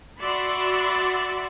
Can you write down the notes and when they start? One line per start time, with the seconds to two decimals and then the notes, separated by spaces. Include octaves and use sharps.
0.19 F#4 D5 E5 F#5 B5 C6